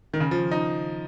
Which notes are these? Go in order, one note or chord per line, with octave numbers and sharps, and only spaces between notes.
D#3
C#3
F3
D#4